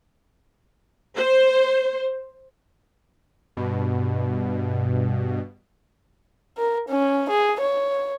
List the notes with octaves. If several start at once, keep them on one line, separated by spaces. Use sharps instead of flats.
C5
G2 B2
A#4
C#4
G#4
C#5